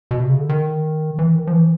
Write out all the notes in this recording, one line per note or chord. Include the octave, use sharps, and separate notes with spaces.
B2
C3
C#3
D3
D#3
E3
D#3
F3
E3